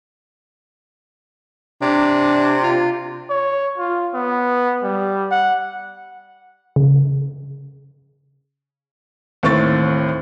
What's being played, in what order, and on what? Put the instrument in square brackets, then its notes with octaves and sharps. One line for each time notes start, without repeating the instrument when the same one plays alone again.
[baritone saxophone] C3 [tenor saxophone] D4
[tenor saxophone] F4
[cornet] C#5
F4
B3
G3
F#5
[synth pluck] C#3
[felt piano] D#2 A2 C4 C#6 A6